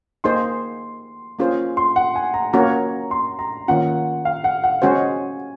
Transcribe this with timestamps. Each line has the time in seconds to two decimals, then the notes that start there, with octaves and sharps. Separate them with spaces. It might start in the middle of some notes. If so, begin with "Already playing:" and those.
0.24 A#3 D#4 G#4 C5 C6
1.39 A#3 C#4 F4 G#4 C5
1.77 C6
1.96 F#5
2.16 G#5
2.34 A#5
2.53 A#3 C#4 F#4 A#4 C#5 A#5
3.11 C6
3.39 A#5
3.68 D#3 A#3 C#4 F4 F#5
4.25 F5
4.44 F#5
4.64 F#5
4.82 G#3 C#4 F#4 C5 G#5